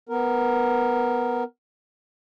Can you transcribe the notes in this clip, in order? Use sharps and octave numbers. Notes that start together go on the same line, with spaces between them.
B3 A#4